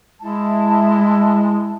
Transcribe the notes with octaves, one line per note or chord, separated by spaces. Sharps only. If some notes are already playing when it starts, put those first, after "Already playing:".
G#3 E4 A5